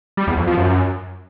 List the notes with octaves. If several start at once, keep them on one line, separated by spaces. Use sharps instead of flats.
G3
E2
F2
F3
F#2